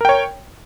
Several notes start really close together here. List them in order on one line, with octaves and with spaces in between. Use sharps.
A#4 G5 C#5